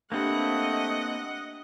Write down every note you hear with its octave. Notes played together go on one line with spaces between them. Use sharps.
A3 A#3 C4 D4 G4 B4 D#5 F#5